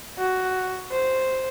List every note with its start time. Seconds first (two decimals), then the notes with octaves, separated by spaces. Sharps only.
0.18 F#4
0.92 C5